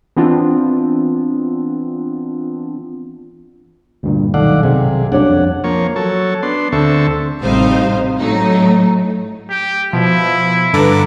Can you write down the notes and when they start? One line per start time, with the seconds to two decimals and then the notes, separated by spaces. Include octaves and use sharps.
0.17 E3 B3 C4 D4 F4
4.03 D2 G2 A#2
4.34 B1 D#3 A4 D5 F5 F#5
4.63 C3 G#4
5.12 D4 C#5 D5 F#5
5.28 F2
5.64 F3 A#3 C#5
5.96 F#3 A4 C#5
6.43 B3 D4 C6
6.72 D2 D3 C4 A4 E5 C#6
7.41 A1 C3 G3 D#4 C5 F5
8.20 A2 F#3 A3 D#4
9.50 G4
9.93 B2 F3 E4
10.74 G2 D3 A4 B4 A#5 D6